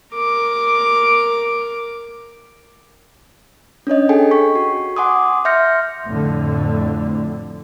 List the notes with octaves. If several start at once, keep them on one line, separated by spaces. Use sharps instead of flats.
A#4 D6
C#4 D4 C#5 D#5
G#4 A4 G5 G#5
C#6 B6
F#4
F#5 G#5 C6 D6 D#6
E5 C6 F6 G6 A#6 C#7
F2 A2 D3